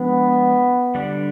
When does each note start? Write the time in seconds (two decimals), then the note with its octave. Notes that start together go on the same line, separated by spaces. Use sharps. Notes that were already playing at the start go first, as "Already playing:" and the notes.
Already playing: F3 G#3 B3 D4
0.95 D3 G3 D4